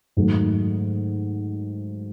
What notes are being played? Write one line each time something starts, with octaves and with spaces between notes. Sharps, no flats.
G#2 D#3 F#3 A3